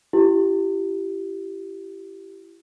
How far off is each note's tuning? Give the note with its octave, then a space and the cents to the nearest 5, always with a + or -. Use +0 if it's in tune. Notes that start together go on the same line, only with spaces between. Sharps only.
E4 +35 G4 -15